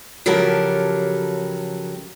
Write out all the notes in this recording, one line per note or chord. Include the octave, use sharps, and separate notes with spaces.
C#3 F3 F#3 G4 A4 A#4